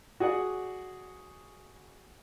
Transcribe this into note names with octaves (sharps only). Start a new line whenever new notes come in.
F#4 G#4 D5 F#5